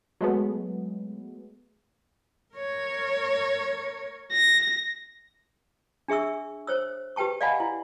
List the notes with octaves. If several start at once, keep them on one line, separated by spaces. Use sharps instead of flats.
F#3 G#3 A3 B3
A#4 C#5
A#6
D4 G#4 E5 C#6 E6
C5 C#5 E6
G4 B4 G5 A5 C#6
D5 D#5 F5 F#5 G#5 B5
E4